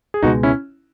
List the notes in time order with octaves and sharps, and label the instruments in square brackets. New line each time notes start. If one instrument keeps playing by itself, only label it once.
[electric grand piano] G#4
[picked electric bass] C#2 B2 G#3 [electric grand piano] D#4 F#4
[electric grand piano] C#4 E4